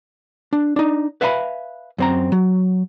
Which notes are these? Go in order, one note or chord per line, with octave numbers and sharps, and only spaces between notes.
D4
D4 D#4
B4 E5 F5 G#5 A5 B5
F#2 C4 A#5
F#3